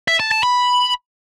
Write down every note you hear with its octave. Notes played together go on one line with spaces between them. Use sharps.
E5
A5
A5
B5